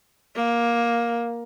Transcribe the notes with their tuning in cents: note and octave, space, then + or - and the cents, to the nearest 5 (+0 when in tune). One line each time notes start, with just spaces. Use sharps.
A#3 +10